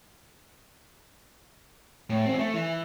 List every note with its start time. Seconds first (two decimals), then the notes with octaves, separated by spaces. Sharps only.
2.10 A2
2.25 E2 C4
2.39 A3
2.54 E3